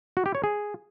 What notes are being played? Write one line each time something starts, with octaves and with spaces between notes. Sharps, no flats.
F#4
G4
C#5
G#4